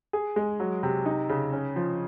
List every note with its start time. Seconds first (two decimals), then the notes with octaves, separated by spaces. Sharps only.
0.13 G#4
0.36 G#3
0.60 F#3
0.83 C3
1.06 D#4
1.29 C#3
1.53 C#4
1.76 F3